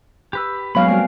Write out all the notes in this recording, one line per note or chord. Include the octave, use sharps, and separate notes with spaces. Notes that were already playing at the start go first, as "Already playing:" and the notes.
G4 B4 E6
F#3 G#3 A#3 B3 C#4 F5 B5
G3 A3 C4 F#4 A#4